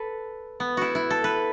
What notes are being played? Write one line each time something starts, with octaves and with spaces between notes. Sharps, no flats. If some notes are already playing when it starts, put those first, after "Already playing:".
Already playing: A4 B4
B3
E4 F#4
E4
A4
B4